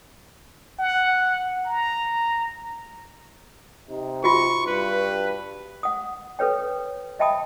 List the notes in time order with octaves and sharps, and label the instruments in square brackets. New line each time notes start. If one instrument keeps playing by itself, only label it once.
[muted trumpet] F#5
A#5
[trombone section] C3 D#4
[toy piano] F4 F#4 [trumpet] C#6
[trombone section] G2 [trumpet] B4
[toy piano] F#5 D#6
A4 B4 C#5 G5
D#5 E5 G5 A5 B5 D#6